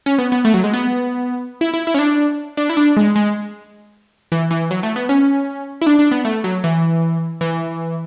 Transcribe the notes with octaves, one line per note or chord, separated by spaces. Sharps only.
C#4
B3
B3
A3
F#3
G#3
B3
E4
E4
E4
C#4
D4
D4
E4
D4
G#3
G#3
E3
E3
F#3
A3
B3
C#4
E4
D4
D4
B3
A3
F#3
E3
E3